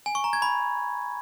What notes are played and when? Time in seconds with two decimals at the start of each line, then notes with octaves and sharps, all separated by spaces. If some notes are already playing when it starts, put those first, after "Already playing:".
0.06 G#5
0.15 C#6
0.24 A#5
0.33 G#6
0.42 B5